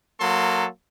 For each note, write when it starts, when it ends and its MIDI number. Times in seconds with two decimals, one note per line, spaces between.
0.20 0.65 54
0.20 0.65 58
0.20 0.65 69
0.20 0.65 84